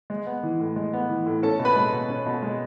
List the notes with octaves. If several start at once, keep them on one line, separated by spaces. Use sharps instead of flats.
G#3
B3
E3
A2
G#3
B3
E3
A2
C#4 A4 A5
B2
B4 B5
G#3
B2
C#4
B2
G#3